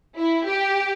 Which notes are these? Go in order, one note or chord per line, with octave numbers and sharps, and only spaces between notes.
E4
G4